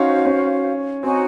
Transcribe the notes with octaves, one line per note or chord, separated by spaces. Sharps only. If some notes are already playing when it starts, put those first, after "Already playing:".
Already playing: C#4 D#4 F#4 C5 F5
C#4
C4 D#4 F#4 C#5 G#5